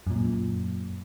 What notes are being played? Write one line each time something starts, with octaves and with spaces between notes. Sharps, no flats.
F#2 A#2